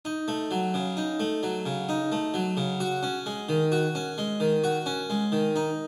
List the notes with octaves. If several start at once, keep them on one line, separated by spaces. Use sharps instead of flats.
D#4
A3
F#3
C#3
D#4
A3
F#3
C#3
D#4
A3
F#3
C#3
F#4
C#4
G#3
D#3
F#4
C#4
G#3
D#3
F#4
C#4
G#3
D#3
D#4